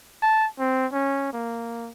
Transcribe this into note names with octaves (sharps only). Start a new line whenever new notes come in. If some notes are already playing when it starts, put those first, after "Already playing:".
A5
C4
C#4
A#3